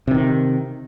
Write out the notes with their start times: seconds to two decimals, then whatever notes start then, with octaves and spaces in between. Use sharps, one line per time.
0.08 C3
0.11 E3
0.14 D#3